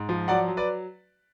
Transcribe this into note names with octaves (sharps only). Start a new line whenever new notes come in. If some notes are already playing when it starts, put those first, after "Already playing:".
Already playing: G#2
F3
F#3 D5 F#5
F#3
B4 D5